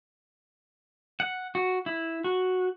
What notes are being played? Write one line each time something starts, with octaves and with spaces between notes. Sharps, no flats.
F#5
F#4
E4
F#4